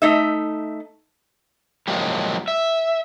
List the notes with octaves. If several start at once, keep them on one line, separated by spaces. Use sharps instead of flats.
A3 D#4 E5
F3 F#3 G#3 A#3 G4
E5